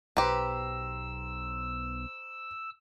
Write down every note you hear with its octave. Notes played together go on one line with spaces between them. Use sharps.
B1 G4 B4 C5 A#5 C6 E6